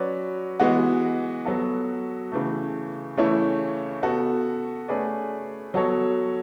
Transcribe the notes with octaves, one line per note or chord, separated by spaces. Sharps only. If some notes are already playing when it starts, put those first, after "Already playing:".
Already playing: F#3 C#4 F#4 B4 D5
E3 G#3 B3 F#4
F#3 B3 F#4 A4
C#3 E3 A3
C#3 E3 A3 C#4 E4
B3 F#4 A4
A3 C#4 G#4 B4 D5
F#3 B3 F#4 A4 C#5